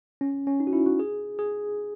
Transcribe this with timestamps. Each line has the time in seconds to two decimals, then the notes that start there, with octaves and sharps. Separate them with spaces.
0.21 C#4
0.47 C#4
0.60 D#4
0.67 F#4
0.73 E4
0.86 F#4
0.99 G#4
1.39 G#4